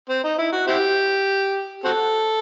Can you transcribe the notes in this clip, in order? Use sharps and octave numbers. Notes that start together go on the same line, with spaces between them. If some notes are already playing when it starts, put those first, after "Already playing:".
C4
D#4
E4
F#4
C4 E4 G4
C4 F#4 A4